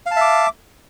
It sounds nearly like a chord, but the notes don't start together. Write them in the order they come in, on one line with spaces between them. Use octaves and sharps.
F5 A5 E5 D6